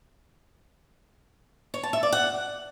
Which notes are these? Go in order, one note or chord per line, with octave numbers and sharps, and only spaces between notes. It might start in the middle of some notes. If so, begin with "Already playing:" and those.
C#5
A5
E5
D5
F#5